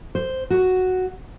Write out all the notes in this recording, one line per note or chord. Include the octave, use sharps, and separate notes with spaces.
C5
F#4